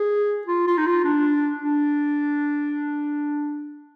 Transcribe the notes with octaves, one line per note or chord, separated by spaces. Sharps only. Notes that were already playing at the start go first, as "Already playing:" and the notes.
Already playing: G#4
F4
F4
D#4
F4
D4
D4